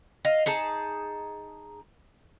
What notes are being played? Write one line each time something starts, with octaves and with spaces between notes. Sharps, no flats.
D#5 F5
D#4 G#4 A5